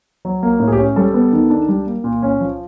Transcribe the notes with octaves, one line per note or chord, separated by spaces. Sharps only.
F#3
A#3
A2
G#4
G4
C#4
G3 A4
B3
D#3
D4
G3
A#3
A#2
C#4
F3